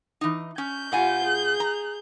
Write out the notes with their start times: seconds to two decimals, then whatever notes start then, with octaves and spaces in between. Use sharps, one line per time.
0.21 E3 D#4
0.58 C#4 G6
0.92 B2 F4 G4 F#5 G#5
1.24 G#4
1.60 A#5